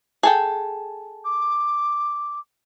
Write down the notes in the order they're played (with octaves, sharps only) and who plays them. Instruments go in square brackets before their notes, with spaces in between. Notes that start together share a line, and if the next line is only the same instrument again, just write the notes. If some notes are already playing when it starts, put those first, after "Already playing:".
[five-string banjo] G#4 A4 G5
[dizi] D6